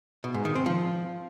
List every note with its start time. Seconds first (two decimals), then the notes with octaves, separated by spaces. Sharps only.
0.24 B2
0.34 G#2
0.45 D#3
0.55 C4
0.66 F3